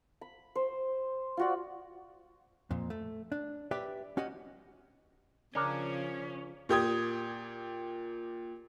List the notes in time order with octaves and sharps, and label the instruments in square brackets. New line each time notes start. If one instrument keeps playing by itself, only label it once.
[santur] B5
C5
F4 F#4 D5
[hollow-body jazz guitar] F2 A#2
A3
D4
G4 B4 D5 E5 G5
C#4 F#4 G4 D#5
[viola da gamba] C#3 F3 [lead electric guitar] C#4 [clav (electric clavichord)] D4 A#4
[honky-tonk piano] A#2 G4 D#6 G#6